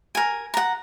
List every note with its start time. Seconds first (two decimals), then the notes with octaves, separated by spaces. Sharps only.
0.15 A#4 G#5
0.54 F#5 A#5